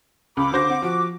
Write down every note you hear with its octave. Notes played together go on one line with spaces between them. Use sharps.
C#2 B5 D6
D3 F#4 C5 A#6
C4 F#5
F3 F#4